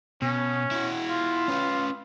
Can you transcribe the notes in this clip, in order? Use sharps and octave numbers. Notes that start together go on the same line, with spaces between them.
B2 C#4
E4 F#4
F4
C#4 B4